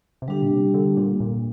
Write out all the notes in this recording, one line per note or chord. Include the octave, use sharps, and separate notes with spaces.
C3
D3 G3 D4 G4
A#2
C3
D3
A#2
A#2